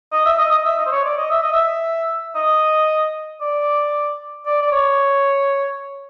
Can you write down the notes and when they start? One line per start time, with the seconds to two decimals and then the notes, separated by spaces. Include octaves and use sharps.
0.13 D#5
0.25 E5
0.38 D#5
0.52 D#5
0.65 E5
0.78 D#5
0.86 C5
0.92 C#5
1.05 D5
1.18 D#5
1.31 E5
1.42 D#5
1.52 E5
2.35 D#5
3.41 D5
4.46 D5
4.62 D5
4.72 C#5